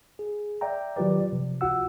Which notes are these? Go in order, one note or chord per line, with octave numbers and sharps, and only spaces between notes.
G#4
D5 E5 G5 A#5
D#3 F#3 F4 G4 B4 D5
C3 F3
C#2 F4 F#4 F#5 E6